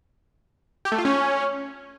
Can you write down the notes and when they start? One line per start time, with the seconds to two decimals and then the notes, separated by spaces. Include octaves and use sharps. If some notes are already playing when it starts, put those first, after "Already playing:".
0.85 G4
0.92 A3
0.98 F4
1.05 C#4